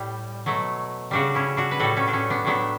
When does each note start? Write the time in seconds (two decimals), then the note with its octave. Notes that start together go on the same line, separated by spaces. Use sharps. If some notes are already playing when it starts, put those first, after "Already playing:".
Already playing: A2 G3
0.46 B2 F#3 A3
1.11 C#3 G3 D4 F#4
1.35 C#4 E4
1.57 D4 F#4
1.71 B4
1.80 A2 G3 F#4 A4
1.97 A3 C#4
2.08 D4
2.13 A3 C#4
2.30 B3 D4
2.45 A2 F#3 A3 B3 D4